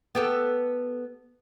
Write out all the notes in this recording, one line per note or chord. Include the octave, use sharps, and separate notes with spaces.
B3 G4 A4